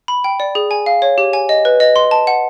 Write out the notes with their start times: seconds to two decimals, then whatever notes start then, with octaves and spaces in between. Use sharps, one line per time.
0.08 B5
0.24 G5
0.40 D5
0.55 G#4
0.71 G#5
0.86 F5
1.02 C#5
1.18 G4
1.33 G#5
1.49 D#5
1.65 B4
1.80 D#5
1.96 C6
2.11 A5
2.27 F#5